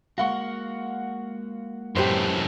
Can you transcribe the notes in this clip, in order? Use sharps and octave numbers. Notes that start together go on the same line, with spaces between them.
G#3 A#3 F#4 F5 F#5 C#6
F#2 A2 G4 B4 C5